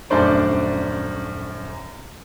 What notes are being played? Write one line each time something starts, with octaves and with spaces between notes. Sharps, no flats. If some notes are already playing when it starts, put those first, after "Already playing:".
D#1 F#2 A3 D4 C5 D5